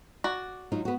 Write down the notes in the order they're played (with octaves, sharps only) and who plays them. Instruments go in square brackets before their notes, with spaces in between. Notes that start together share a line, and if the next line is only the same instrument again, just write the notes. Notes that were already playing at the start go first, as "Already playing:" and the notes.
[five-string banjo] F#4 D5
[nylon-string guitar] F#3 D#4 F4
B3 F#4